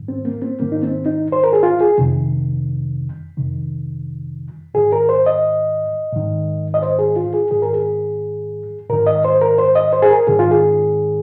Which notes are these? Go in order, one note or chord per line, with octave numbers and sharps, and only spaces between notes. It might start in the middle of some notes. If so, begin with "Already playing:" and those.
Already playing: G#2 D#3
C4
A#3
C4
G#2 D#3 A#3
D#4
C4
D#4
C5
A#4
G#4
F4
G#4
F2 C3 D#3
F2 C3 D#3
G#2 D#3 G#4
A#4
C5
D#5
G#2 D#3
D#5
C5
G#4
F4
G#4
G#2 D#3 G#4
A#4
G#4
G#2 D#3 A#4
D#5
C5
A#4
C5
D#5
C5
G#4
A#4
G#2 D#3 G#4
F4
G#4